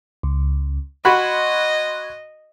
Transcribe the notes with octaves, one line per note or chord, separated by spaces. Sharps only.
C#2
F#4 D#5 B5 C6 F#6 G#6